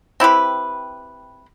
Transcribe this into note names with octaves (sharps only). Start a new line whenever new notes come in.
C4 E4 G4 B4